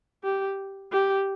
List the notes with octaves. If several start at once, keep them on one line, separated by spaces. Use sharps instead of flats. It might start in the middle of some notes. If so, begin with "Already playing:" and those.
G4
G4